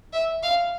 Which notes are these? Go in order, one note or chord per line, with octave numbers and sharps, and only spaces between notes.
E5
F5